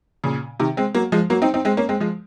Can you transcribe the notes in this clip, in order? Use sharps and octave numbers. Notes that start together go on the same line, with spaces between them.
A#2 C#3
C3 D#3
G#3 C4
F#3 A#3
F3 G#3
F#3 A#3
C4 D#4
C4 D#4
G#3 C4
A#3 C#4
G#3 C4
F3 G#3